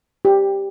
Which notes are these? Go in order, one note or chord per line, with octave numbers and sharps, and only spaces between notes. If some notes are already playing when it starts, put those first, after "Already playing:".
G4